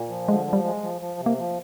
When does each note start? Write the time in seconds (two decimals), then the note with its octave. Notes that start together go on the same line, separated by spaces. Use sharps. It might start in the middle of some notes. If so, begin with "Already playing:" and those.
Already playing: A#2
0.09 F3
0.28 D3 G#3
0.46 F3
0.53 G3
0.64 G#3
0.83 F3
1.01 F3
1.20 C3
1.26 A#3
1.38 F3